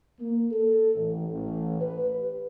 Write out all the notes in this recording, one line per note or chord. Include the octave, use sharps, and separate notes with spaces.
A#3
A4
A1
A1
B4
G4